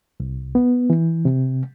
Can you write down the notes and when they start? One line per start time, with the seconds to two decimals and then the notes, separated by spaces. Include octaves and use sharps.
0.20 C2
0.55 B3
0.90 E3
1.25 C3